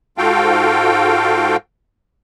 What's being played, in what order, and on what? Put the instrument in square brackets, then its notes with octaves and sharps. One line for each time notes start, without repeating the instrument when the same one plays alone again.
[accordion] G#2 F4 F#4 A4 F5 G5